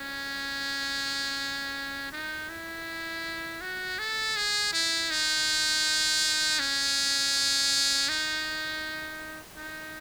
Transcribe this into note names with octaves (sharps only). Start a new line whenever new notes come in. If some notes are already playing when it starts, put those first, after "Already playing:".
Already playing: C#4
D#4
E4
F#4
A4
G#4
E4
D#4
C#4
D#4
D#4